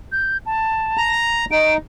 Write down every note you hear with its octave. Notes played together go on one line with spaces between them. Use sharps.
G6
A5
A#5
D#4 D7